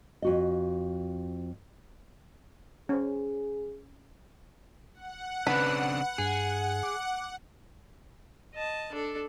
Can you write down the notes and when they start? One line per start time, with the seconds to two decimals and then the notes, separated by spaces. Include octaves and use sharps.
0.22 F2 F#4 D#5
2.89 C#4 G#4 C5
4.94 F#5
5.47 C#3 C4 D4 B4
6.18 G2 G#4
6.83 D6
8.53 D#5 A5
8.92 D4 A4